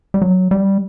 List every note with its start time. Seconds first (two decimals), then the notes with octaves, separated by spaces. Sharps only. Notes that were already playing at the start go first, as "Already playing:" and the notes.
0.14 G3
0.22 F#3
0.51 G3